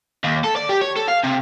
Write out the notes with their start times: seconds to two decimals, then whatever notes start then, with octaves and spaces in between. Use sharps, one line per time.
0.24 D#2
0.44 A4
0.56 D5
0.69 G4
0.82 C#5
0.96 A4
1.08 F5
1.24 C3